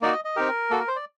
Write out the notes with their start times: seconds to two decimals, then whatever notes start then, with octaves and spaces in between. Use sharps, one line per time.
0.01 A#3 D#4 F#4 D5
0.13 D#5
0.24 D#5
0.36 C4 D#4 G4 A#4
0.70 A#3 F#4 A4
0.80 A#4
0.88 C5
0.96 D5